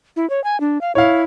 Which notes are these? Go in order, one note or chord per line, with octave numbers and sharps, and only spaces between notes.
E4
C#5
G#5
D4
F5
E4 C#5 F5